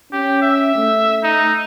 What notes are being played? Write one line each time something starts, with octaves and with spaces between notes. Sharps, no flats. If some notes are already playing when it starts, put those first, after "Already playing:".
C#4 G4
E5
A3
D#4